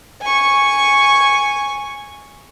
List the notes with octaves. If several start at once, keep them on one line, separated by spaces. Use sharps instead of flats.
G#5 C#6